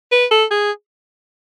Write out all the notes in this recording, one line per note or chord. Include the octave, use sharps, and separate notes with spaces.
B4
A4
G#4